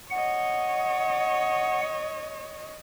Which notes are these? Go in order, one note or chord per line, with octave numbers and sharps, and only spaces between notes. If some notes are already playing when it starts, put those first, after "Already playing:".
C#5 D#5 F#5